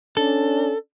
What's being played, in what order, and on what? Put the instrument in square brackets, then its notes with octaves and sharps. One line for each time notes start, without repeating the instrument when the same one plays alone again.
[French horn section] C#4 D4 [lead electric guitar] A4